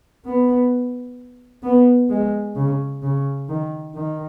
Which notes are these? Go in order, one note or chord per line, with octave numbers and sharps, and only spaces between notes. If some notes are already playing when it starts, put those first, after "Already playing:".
B3
B3
G#3
C#3
C#3
D#3
D#3